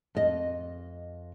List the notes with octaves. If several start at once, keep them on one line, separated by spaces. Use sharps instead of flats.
F2 D#5